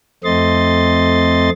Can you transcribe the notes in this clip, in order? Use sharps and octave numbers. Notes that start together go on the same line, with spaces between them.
F2 A3 C4 D#5 C6 A6